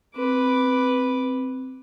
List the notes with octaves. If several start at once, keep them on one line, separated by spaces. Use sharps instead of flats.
C4 B4 D6